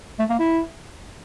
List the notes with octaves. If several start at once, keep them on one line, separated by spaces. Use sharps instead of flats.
A3
A#3
E4